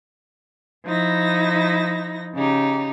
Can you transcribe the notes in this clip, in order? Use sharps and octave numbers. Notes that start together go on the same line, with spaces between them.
F3 D#4 E4 A#6
C#3 D#4 G4